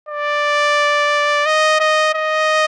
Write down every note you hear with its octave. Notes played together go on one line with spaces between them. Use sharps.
D5
D#5
D#5
D#5